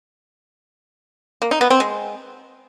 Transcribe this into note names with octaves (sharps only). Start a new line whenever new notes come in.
A#3
D#4
B3
C4
G#3